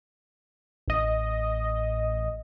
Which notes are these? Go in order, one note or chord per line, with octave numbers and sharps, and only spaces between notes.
A1 D#5